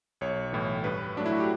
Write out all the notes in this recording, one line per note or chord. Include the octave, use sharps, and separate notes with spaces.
B1 C#5
A2 E3
G2 B4
F#3 A3 D4
E4
F#4
G4